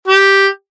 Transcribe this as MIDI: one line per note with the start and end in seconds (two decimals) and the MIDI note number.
0.08 0.47 67